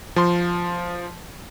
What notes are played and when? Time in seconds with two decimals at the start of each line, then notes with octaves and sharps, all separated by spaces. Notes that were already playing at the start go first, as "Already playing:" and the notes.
0.16 F3 C6